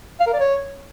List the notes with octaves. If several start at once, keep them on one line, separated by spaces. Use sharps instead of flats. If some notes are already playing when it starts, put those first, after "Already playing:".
F5
A#4
D5
C#5